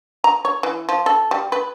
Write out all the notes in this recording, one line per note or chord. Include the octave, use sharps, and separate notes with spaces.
A#5
C#5
E3
F3
A4
G3
B4